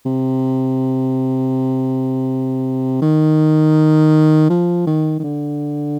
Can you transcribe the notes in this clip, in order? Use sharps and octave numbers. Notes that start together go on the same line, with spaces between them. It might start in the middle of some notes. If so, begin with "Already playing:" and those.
C3
D#3
F3
D#3
D#3
D3